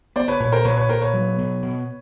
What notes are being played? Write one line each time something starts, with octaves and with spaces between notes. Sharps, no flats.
B3 C5 D5
B4 C#5
A#2 B4 C#5
A#4 C5
A#2 B4 C#5
B4 C#5
A#2 A#4 C5
B4 C#5
F#3
B2
B2